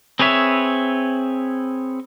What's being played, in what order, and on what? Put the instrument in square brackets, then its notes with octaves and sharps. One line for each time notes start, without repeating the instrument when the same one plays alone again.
[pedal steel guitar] C4 G#4 B4 C#5 E5